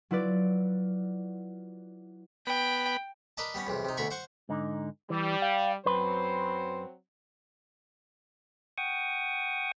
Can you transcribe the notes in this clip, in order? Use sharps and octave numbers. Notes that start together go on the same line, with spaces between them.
F#3 E4 F4 B4 D5
B3 G5 B5
A#4 B4 D5 D#5 A5
G3 B3 C#4
B1 E2 C3
C3 D#4
D2 B2 D3 A#4 B5 C#6
C5 F#5 C#6
G#2 D3 D#4
E3 G3
F5
F#2 F#3 C4 B4 C5 C6
F#5 G5 C#6 D#6